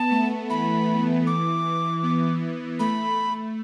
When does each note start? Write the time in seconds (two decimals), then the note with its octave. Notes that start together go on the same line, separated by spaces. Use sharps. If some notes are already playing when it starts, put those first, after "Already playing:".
Already playing: B3 A5
0.11 A3
0.49 E3 B5
1.27 D6
2.03 B3
2.79 A3 B5
3.18 A3